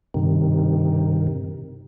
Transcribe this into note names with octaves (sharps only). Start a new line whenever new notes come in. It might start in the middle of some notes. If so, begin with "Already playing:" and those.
G2 C3 D#3